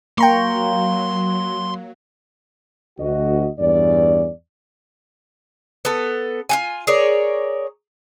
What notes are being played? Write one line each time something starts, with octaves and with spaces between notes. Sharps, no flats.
F#3 A#3 G5 A#5 C6 C#6
D2 F#4 D#5
E2 G2 C#4 D5
B3 A4
F4 F#4 G#5
G#4 A#4 C#5 D5